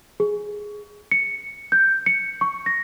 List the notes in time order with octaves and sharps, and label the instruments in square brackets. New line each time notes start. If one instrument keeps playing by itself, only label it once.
[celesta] G#4
C#7
G6
C#7
C#6
A#6